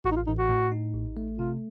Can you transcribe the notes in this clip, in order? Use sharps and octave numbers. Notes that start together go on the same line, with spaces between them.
A1 F#4
D#4
F4
A1 D#4
F#4
A2
D#4
A1
A3
C3 F4